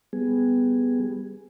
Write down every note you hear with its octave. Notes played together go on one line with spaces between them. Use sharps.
G3 B3 G#4